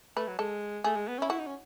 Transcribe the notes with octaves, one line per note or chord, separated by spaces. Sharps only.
A3 B4
F#3
G#3 A4
A3 G#4
G#3
B3
C#4 E4
E4 F#4
D#4
C#4